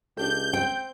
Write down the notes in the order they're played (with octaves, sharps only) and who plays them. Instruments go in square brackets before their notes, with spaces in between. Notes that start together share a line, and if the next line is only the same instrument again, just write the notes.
[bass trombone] C#2 [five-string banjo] D4 G4 A4 [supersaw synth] G6
[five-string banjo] C4 [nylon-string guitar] G5